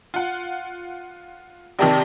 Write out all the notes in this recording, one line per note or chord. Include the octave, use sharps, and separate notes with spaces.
F4 F#5
A#1 C3 D#3 G4 D5 A5